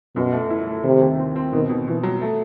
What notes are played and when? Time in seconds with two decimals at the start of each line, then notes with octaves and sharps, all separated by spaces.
0.16 F#2 B2
0.32 A3
0.50 E4
0.67 A3
0.84 C3 D#3
1.01 D#2
1.19 C4
1.36 C4
1.53 B2 D#3
1.69 B2
1.87 B2 E3
2.03 F#3
2.21 A3